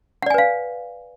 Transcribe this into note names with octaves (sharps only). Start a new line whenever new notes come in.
B4 D5 F5 F#5 G#5